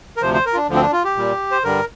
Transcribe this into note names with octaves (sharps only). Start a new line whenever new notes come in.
A#4
D2 C3 F3 C5
C5
A#4
F4
D4
D2 D3 F3
C4
D4
F4
G4
A#2 G3
C5
G2 D3 G3 A#4